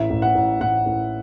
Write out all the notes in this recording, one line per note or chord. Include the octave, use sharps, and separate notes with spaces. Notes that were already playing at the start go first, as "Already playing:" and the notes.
Already playing: A1 E5
A1
F#5
A1
A1 F#5
A1